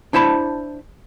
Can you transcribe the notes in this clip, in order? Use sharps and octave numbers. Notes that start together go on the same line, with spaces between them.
D4 E4 C5 A5 B5